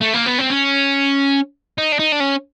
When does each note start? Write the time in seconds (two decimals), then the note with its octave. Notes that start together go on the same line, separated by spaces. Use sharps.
0.01 A3
0.13 A#3
0.26 B3
0.38 C4
0.50 C#4
1.78 D#4
1.92 D4
1.99 D#4
2.12 D4
2.20 C#4